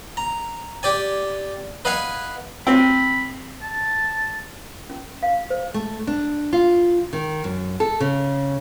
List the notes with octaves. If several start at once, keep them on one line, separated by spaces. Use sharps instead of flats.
A#5
G4 D5 G#5
B4 D#5 F5 F#5 G#5
C4 B5
A5
C#4
F5
C5
A3
D4
F4
D#3
F#2
A4
C#3